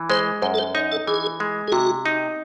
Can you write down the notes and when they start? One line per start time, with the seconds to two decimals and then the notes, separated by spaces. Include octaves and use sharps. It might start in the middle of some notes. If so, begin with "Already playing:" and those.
Already playing: E3
0.10 G#3 C5
0.42 F#2 C5
0.54 A4
0.58 C5
0.75 D#4 C#5
0.92 A4
1.07 E3 G#4
1.40 G#3
1.68 G#4
1.72 C3 F#4
2.06 D#4